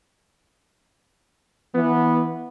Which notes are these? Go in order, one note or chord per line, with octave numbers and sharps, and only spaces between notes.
E3 B3